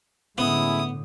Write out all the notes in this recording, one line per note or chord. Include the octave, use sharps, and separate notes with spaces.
A2 D3 G#3 B3 C#4 E4 D#6